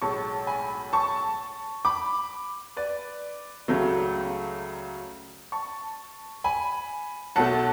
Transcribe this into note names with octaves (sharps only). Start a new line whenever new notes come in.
B1 A2 G#3 A5 C#6
G#5 B5
A5 C#6
B5 D6
B4 D5
C#2 C#3 F#3 A3
A5 C#6
G#5 B5
B1 B2 A3 F#5 A5